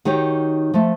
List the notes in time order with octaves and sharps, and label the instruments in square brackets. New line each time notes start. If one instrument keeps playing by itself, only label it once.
[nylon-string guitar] D#3 D#4 F#4 G4 C#5
F3 A3